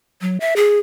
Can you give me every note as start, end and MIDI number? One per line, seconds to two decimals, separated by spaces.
0.21 0.38 54
0.40 0.54 76
0.56 0.79 68